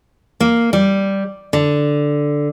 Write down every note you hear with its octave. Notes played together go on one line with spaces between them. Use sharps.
A#3
G3
D3